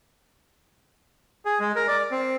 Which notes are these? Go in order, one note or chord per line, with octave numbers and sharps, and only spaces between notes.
G#4
G#3
A#4
D5
C4